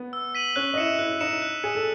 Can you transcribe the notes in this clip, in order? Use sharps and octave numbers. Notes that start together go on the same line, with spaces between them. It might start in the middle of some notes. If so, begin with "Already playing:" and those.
Already playing: B3
E6
B6 D#7 F#7
C#4 C#5 F#6
D#5
E4 E5 C#7 E7
E4 E5 F#6
D#4 D#5 C#7 E7
F#6
G#4 C#7 E7
A4